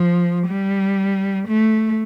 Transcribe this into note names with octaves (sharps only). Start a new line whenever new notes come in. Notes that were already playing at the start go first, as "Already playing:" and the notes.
Already playing: F3
G3
A3